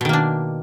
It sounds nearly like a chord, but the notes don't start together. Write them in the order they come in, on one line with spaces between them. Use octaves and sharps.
B2 D#3 A#3 D4